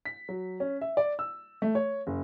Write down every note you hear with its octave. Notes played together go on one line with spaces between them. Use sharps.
B6
F#3
C#4
E5
D5
E6
A3
C#5
F#1